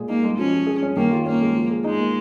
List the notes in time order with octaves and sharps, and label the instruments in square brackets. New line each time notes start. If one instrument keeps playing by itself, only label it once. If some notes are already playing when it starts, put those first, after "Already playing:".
Already playing: [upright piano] A#2 G#3 G#4
[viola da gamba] A#3 [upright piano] D#4
[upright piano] G#3
[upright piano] F3 [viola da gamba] C#4
[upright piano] F3
G#4
C#4
[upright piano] D#3 [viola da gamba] A#3
[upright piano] F4
[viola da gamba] A#3 [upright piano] C#4
[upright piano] G#3
F3
G#4
[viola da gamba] G#3 [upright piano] D#4
[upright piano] A#3